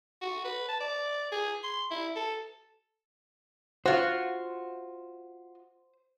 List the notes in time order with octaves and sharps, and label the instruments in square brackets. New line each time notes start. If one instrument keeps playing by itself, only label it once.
[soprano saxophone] F#4
B4
A5
D5
G#4
C6
E4
A4
[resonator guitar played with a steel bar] F4 F#4 [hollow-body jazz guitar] C5